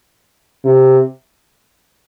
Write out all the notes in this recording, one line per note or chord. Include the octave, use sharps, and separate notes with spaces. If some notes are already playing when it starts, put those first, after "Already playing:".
C3